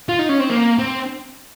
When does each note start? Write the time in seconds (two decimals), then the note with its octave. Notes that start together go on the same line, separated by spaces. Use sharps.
0.09 F4
0.19 D#4
0.29 C#4
0.40 C4
0.50 A#3
0.78 C4